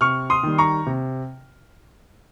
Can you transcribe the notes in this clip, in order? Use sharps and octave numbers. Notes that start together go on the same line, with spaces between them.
C3 C#6 F6
C6 D#6
D#3 G3
A#5 C#6
C3